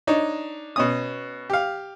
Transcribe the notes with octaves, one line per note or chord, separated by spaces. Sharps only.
D4 D#4 C#5
B2 C#4 D#6
G4 F5